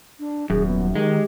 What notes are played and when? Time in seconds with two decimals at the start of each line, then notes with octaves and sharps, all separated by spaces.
0.19 D4
0.50 D#1 F#2 G#4
0.65 B3
0.95 D#3 G#3 G4